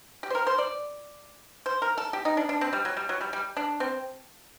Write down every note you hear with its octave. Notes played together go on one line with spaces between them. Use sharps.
G4
C5
A#4
C5
D5
C5
A#4
A4
G4
D#4
D4
D4
C4
G3
F#3
G3
F#3
G3
G3
D4
C4